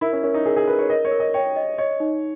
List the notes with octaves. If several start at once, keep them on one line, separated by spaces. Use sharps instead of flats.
E4 A#4
C#4
C#4 A#4
D#4
G#4 A#4
G#4
A#4 B4
C#5
A#4 D#5
C#5
A#4
D#5
C#5 G5
D#5
C#5 D#5
D#4